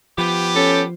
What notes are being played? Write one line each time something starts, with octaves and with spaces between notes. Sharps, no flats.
F3 B3 G4
C#4 A4